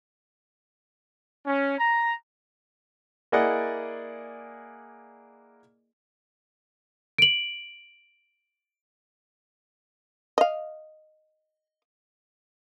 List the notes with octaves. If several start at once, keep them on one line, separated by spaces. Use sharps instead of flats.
C#4
A#5
A#3 E4 G#4 D5 D#5 F#5
D7 F#7
D#5 F5